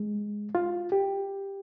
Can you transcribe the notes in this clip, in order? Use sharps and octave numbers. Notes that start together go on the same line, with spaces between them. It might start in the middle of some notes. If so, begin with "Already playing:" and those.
Already playing: G#3
F4
G4